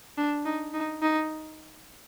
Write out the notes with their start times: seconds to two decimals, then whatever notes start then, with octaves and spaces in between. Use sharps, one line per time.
0.18 D4
0.46 D#4
0.74 D#4
1.02 D#4